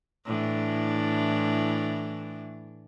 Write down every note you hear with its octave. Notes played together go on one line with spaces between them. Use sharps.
A2 E3 D4